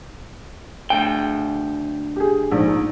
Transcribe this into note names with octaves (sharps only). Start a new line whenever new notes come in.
D2 G5
G4 G#4
A#1 G#2